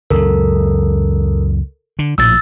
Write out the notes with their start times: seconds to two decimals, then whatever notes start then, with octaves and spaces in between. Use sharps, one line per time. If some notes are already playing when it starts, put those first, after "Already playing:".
0.10 C#2 F#2 F#3 A4 A#4
1.99 D3
2.18 A#1 A2 F3 E6 A6